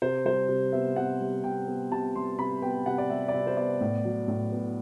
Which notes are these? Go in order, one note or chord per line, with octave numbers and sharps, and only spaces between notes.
C3 C5
G3 C5
C3
B3 E5
C3 F#5
G3
C3 G5
B3
C3 A5
G3 C6
C3 B5
B3 G5
C3 F#5
D5
G3 E5
D5
C3 E5
C5
B3 D5
A2
F#3
A2
B3